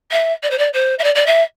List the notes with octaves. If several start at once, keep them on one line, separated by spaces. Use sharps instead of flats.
E5
D5
C5
D5
C5
E5
D5
D5
E5